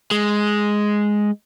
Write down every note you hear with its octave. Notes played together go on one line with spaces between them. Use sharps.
G#3